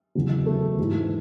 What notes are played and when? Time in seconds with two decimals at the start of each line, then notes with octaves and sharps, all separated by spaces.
0.15 E2 C#3 F#3
0.46 A3
0.78 G#2 E3